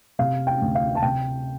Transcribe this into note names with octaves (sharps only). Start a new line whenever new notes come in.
C3 F5
G5
D2
F5
A5
C3 G5